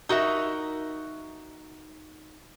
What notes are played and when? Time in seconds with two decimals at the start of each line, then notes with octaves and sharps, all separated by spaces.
0.09 D#4 F#4 A#4 E5